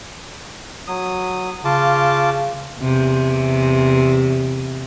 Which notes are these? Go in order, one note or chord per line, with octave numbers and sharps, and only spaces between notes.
F#3 D#6
C#3 F4 A5 D6
E2 C3